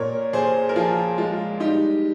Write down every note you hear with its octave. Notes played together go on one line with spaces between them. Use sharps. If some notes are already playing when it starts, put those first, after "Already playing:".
Already playing: A#2 A#4 C#5
A#2 G#4 C5
A#4
F3 F4 G#4
G#3 F4
G3 D#4 G4